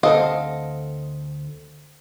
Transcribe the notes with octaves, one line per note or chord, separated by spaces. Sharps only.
D2 C4 A4 D#5 F5